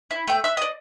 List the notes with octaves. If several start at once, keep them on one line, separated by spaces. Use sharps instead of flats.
E4
A3 G5
E5 E6 F#6
D5 D#5